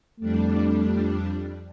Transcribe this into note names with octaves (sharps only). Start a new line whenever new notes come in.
F2 G3 A3 D4